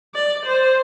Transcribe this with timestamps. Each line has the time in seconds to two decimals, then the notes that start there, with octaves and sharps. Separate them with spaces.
0.15 D5
0.46 C5